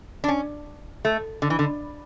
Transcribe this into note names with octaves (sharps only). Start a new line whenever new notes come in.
D4
C#4
A3
D3
E3
D3